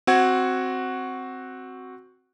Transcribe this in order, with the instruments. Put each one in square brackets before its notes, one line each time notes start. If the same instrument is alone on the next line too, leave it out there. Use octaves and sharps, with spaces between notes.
[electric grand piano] C4 F#4 F#5 G#6